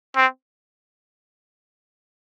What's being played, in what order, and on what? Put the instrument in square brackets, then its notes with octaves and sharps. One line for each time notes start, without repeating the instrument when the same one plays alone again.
[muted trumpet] C4